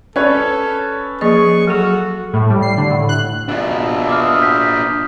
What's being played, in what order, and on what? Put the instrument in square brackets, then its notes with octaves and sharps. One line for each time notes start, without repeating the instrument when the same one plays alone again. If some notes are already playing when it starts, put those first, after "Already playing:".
[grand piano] C#4 B4 C#5 [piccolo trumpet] A4 [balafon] D5
[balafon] F3 A#3 D#5 [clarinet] G#4 [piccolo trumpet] C#6
[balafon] F#3 G#4 [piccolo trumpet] F#4 [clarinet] A4
[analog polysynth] A2
G3
C7
D3
A2
F#6
[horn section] B2 E5 [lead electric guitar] D4 F4
[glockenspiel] D6 D#6 F6
G6 B6